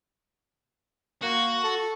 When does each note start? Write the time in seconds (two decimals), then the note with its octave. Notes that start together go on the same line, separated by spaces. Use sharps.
1.23 A#3 F#4
1.64 A4